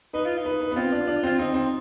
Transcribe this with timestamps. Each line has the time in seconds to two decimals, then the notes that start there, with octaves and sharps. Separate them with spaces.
0.14 D#4 B4
0.25 F4
0.37 D#4
0.46 B4
0.61 B4
0.71 B3
0.76 C4 F4
0.92 D4
1.08 D4
1.23 C4 F4
1.39 C4 D#4
1.54 C4